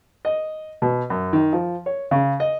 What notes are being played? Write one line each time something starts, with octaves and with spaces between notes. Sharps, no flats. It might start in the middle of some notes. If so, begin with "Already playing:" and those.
D#5
B2
F#2
D#3
F3
C#5
C#3
D#5